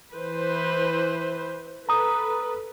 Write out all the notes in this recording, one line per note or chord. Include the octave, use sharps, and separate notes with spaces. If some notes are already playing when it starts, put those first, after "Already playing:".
E3 B4 C5
A4 B4 A#5 D#6